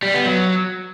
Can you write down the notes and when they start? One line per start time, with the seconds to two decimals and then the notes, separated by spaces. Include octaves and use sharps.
0.03 G3
0.14 B3
0.26 F#3